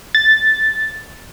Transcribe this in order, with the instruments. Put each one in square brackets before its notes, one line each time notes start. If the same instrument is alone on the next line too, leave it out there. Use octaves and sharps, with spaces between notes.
[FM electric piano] A6